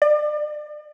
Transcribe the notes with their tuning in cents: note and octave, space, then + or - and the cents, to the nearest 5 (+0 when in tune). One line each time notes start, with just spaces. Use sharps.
D5 +35